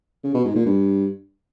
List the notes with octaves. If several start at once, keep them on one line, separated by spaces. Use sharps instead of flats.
C#3
B2
G#2
A#2
G2